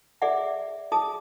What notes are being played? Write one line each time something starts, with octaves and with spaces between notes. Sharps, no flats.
G#4 D5 E5 F#5
G#4 A5 D#6